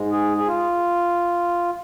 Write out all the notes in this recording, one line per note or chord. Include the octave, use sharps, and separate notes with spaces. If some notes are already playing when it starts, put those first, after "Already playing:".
Already playing: G#2 G#3
G#4
G#4
F4